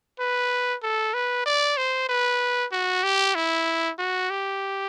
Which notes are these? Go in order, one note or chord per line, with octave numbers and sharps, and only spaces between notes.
B4
A4
B4
D5
C5
B4
F#4
G4
E4
F#4
G4